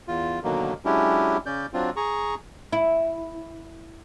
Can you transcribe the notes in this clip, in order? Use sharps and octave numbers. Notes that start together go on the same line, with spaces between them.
E2 F4
B2 D3 D#3 F#3 A#3
F#3 G#3 C#4 D4 E4 G4
C#3 C#4 D5 G6
F#3 C4 D4 F4
G#4 A#5 C#6
E4